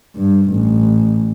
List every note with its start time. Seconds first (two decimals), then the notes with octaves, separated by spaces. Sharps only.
0.16 G2
0.50 A1